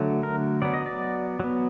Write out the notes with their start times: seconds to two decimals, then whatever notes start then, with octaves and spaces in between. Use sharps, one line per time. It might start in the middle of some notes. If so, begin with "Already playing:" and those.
Already playing: D3 F#3 A3
0.23 A#4
0.62 F#3 B3 D5
0.74 D#5
0.86 D5
1.40 F#3 B3